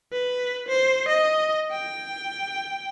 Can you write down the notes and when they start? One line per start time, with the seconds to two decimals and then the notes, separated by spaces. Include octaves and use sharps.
0.13 B4
0.68 C5
1.08 D#5
1.71 G5